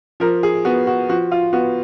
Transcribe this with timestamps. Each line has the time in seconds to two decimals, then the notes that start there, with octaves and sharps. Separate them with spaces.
0.20 F3 A#4
0.43 G#4
0.65 B3 F#4
0.87 F#4
1.09 F3 F#4
1.31 F4
1.53 B3 F#4